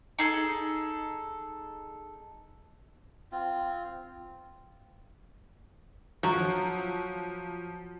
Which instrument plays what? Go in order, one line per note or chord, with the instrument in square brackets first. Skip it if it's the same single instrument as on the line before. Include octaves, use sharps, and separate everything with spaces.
[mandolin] D#4 G#4 A4
[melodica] C4 F4
[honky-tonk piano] F3 [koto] F#3